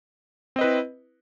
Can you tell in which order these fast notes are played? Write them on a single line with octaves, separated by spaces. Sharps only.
C4 D#5 B4 E4